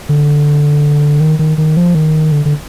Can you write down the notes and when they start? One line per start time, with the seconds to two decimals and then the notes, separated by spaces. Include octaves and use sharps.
0.09 D3
1.20 D#3
1.39 D#3
1.58 D#3
1.77 F3
1.95 D#3
2.32 D3
2.45 D3